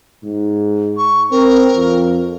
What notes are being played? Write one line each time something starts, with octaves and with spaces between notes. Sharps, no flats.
G#2
C#6
C4 A#4
F2